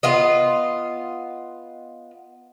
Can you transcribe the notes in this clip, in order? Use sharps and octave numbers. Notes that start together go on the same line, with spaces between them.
B3 F4 D#5